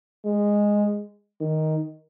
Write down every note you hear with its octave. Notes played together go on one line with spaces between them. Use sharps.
G#3
D#3